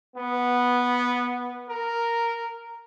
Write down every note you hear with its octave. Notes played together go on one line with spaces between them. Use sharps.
B3
A#4